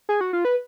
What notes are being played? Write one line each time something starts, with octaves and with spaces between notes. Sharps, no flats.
G#4
F#4
F4
B4